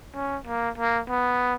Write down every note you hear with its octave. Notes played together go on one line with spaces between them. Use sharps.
C#4
A#3
A#3
B3